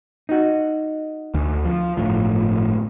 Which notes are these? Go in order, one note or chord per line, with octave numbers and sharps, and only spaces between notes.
D#4 F#4
D2
F3
G1 A2 F3